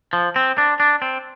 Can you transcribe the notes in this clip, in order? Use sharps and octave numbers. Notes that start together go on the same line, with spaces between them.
F3
C4
D4
D4
C4